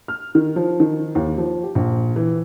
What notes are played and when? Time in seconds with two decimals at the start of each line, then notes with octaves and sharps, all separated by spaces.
0.08 F6
0.35 D#3
0.56 F3
0.80 D#3
1.15 D#2
1.38 F3
1.63 G4
1.75 A#1
2.16 E3